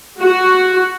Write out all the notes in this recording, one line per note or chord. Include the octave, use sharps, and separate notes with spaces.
F#4